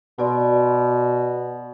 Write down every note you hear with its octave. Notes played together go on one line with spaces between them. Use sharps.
B2 F#4 D5 C6